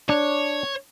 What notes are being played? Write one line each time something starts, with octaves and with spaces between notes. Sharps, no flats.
D4 C#5